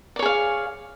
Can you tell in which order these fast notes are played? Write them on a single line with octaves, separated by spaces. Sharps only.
D5 C#5 G#4 F5